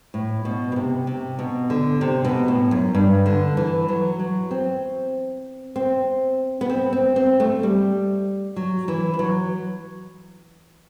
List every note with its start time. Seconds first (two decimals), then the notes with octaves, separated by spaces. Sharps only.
0.14 A2
0.45 B2
0.72 B2
0.76 C3
1.07 C3
1.39 B2
1.70 D3
2.01 C3
2.25 B2
2.48 A2
2.71 F#2
2.95 G2
3.26 D3
3.57 E3
3.89 F#3
4.19 F#3
4.51 C4
5.76 C4
6.61 B3
6.70 C4
6.93 C4
7.16 C4
7.40 A3
7.63 G3
8.56 F#3
8.88 E3
9.14 E3
9.19 F#3